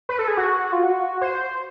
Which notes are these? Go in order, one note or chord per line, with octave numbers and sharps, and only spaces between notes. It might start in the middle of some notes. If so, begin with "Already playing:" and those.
B4
A4
G#4
F#4
F4
F#4
C5